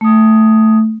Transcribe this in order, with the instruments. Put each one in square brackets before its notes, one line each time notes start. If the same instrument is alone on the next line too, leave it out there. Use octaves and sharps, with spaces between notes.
[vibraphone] A3 D#6